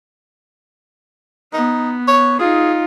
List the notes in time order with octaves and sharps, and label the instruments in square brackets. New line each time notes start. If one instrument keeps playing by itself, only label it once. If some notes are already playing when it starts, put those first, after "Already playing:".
[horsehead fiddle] B3 [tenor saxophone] D#4
[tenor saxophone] C#5
[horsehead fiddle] D#4 F4 [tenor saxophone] G#4